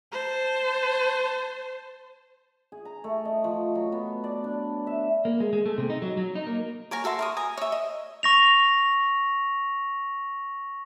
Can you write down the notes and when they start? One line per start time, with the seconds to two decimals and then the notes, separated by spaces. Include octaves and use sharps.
0.12 C5 A5
2.72 G#4
2.85 A#5
3.04 A3
3.25 D#5
3.44 F3
3.75 F#3
3.92 B3
4.24 D5
4.44 D4
4.87 E5
5.25 A#3
5.40 G#3
5.53 G#3
5.66 A3
5.78 C3
5.90 D#4
6.02 F#3
6.17 F#3
6.35 D#4
6.47 A#3
6.91 A#4 C#5 G#5 A#5
7.04 F#4 A4 E5 C6
7.19 A#4 C#6 D#6
7.37 G#5 A#5 D#6
7.58 C#5 E5
7.72 D#5
8.23 C#6 A#6 F7